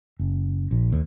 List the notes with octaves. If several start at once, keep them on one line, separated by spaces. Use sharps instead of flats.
F#1
A#1
D#2